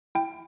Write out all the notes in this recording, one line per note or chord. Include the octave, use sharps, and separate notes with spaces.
E4 G5